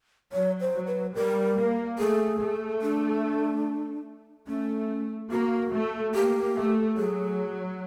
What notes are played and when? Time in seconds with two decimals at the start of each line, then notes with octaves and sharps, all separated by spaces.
0.32 F#3 C#5
0.60 C5
0.74 F#3
0.87 B4
1.15 G3 A#4
1.57 A#3
1.99 A3 G#4
2.40 A3
2.82 D4
4.48 A3 C#4
5.31 A#3 F#4
5.72 A3
6.14 A#3 G4
6.56 A3
6.97 F#3 G#4